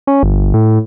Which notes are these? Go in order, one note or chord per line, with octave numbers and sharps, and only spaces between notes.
C#4
G1
A2